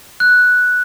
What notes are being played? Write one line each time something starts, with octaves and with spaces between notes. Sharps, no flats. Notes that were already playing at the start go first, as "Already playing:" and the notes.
F#6